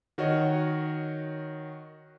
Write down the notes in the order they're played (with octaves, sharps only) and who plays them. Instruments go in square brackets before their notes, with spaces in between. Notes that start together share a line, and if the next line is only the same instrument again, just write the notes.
[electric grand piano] D#3 F#4 A#4 C#5 D#5